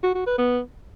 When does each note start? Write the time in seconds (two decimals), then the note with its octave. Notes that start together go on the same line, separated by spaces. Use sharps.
0.03 F#4
0.15 F#4
0.27 B4
0.38 B3